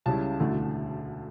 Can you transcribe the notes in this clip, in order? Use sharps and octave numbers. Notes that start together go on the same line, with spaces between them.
C#2 C#3 G3 C#4 E4 A5
E1 D2 D3 A3 E4